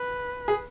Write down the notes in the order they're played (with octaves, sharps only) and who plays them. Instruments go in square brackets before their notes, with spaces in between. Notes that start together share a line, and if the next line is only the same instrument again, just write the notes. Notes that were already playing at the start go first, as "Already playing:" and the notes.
Already playing: [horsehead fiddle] B4
[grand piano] G#4